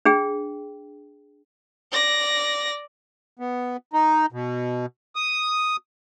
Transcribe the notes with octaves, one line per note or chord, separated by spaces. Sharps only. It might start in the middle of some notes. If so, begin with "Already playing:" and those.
D4 G#4 G5
D5 A#6
B3
D#4
B2
D#6